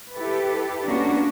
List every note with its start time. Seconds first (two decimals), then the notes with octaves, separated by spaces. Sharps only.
0.15 E4 G4 A4 B4
0.86 A#3 B3 C#4 D4 F#4